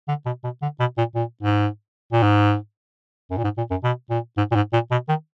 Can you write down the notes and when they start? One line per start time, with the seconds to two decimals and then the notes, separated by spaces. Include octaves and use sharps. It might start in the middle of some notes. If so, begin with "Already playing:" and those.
0.08 D3
0.26 B2
0.44 B2
0.62 D3
0.80 B2
0.98 A#2
1.15 A#2
1.43 G#2
2.13 A#2
2.23 G#2
3.31 F#2
3.38 A#2
3.44 G#2
3.57 A#2
3.71 F#2
3.83 B2
4.10 A#2
4.37 G#2
4.51 A#2
4.56 G#2
4.73 A#2
4.91 B2
5.09 D#3